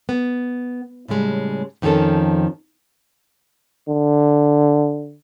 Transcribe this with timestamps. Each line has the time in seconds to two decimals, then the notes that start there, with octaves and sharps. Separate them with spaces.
0.09 B3
1.08 A2 C#3 G3 G#3
1.82 F2 D#3 F3 C#4 A4
3.88 D3